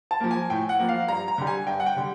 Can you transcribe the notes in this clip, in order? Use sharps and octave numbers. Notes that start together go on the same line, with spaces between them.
A5
F3 A#3
G#5
A2 G5
F#5
F3 A#3
F5
G2 A#5
A#5
D3 G3
G#5
G2 G5
F#5
G5
D3 G3